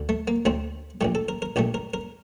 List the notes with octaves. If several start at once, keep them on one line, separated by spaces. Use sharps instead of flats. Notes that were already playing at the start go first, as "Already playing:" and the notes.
Already playing: D2 D3
A3
A#3
D2 D3 A3 C4
A#1 A#2 A3 G4
A4
A#4
A#4
A#1 A#2 A3 G4
A#4
A#4